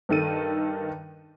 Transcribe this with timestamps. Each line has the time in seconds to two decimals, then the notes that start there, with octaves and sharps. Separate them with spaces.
0.09 G2 D#3 A4 D#7